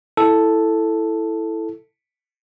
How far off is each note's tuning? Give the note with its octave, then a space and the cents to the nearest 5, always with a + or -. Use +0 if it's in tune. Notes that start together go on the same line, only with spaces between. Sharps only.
E4 +0 A4 +0